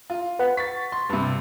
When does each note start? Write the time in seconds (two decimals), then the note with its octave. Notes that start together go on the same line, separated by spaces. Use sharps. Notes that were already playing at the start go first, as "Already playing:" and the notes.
0.10 F4
0.39 B4 F#5
0.57 C#6 A6 B6
0.92 C6
1.09 G2 C3